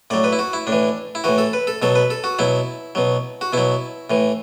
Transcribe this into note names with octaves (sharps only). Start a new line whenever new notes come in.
A2 F#3 D5
B4
E4
F#4
E4
A2 D4
E3
E4
A2 E3 F#4
A4
B4
A4
B2 F#3 A4
B4
A4
F#4
B2 F#3 E4
B2 F#3
F#4
B2 F#3 E4
A2 E3